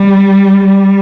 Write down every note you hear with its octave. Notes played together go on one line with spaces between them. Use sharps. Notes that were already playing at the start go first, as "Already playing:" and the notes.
Already playing: G3
G3